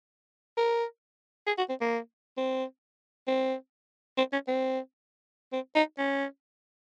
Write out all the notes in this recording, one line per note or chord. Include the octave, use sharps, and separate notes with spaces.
A#4
G#4
F#4
C4
A#3
C4
C4
C4
C#4
C4
C4
D#4
C#4